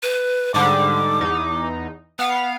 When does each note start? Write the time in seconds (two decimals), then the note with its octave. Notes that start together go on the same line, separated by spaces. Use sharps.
0.03 B4
0.54 G#2 D3 G3 D6
1.21 E2 D#4
2.19 B3 F5 F#5